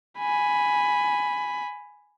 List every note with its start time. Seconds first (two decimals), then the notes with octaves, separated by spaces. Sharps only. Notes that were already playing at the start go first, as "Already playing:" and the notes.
0.20 G#5 B5